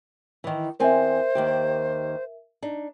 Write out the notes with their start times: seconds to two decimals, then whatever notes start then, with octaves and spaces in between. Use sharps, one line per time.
0.44 D#3 E3
0.80 E2 C4 A#4 C5 E5 G#5
1.35 D#2 D#3 G4
2.62 D4 D#4